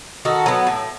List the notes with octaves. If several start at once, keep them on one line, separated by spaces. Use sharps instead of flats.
D#3 F#4 A4
F#3 B3
A2